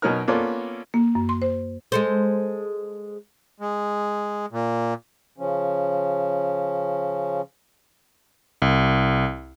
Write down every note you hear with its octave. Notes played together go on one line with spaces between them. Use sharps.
B2 F#3 C#4 D#4 A#4 F6
A#3 B3 C#4 F4 A4 D5
A#3
F#2
C6
C5
G#3 A4 C5
G#3
A#2
C#3 F3 C#4
C2